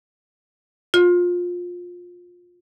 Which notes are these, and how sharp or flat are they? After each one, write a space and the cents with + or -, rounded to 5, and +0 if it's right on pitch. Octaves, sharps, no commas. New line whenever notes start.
F4 +20